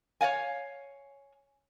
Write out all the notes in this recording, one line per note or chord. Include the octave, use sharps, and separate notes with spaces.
C#5 D5 F5 G#5